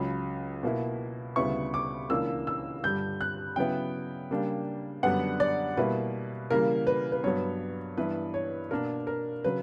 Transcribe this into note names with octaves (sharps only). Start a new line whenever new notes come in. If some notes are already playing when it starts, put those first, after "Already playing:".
Already playing: C#2 C#3 F#3 B5
B2 A#3 E4
D2 C#3 G3 B3 E4 C#6
D6
C#2 C#3 E3 A#3 D4 E6
E6
G2 D3 G3 G6
F#6
C#3 F#3 B3 E4 G5
C#3 G3 A#3 D4
F#2 D3 G3 B3 D4 F#5
D5
B2 G3 A#3 E4 B4
C#3 E3 G3 A#3 A#4
B4
B4
G2 F#3 B3 C#5
G2 E3 B3 E4 B4
C#5
B2 A#3 D4 A#4
A#4
C#3 F#3 B4